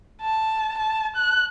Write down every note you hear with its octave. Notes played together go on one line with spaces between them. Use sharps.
A5
A5
F#6